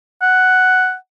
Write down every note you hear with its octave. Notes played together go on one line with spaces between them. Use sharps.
F#5